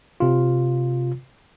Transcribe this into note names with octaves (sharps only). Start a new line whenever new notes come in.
C3 F4